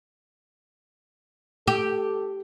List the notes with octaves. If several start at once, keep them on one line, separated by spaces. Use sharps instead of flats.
G4 A4